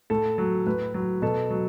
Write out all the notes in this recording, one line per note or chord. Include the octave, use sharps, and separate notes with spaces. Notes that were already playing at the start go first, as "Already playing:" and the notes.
A2 A4
F#3
A2 B4
F#3
B2 A4
F#3